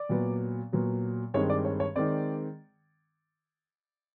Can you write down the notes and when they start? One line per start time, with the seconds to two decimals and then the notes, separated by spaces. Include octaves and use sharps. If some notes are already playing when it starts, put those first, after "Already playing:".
Already playing: D5
0.09 A#2 F#3 B3
0.72 A#2 F#3 B3
1.34 G2 D#3 G#3 C4 C#5
1.50 D5
1.65 C#5
1.80 C#5
1.96 D#3 G#3 C4 D5